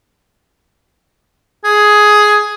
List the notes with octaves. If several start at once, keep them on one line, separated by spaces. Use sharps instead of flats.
G#4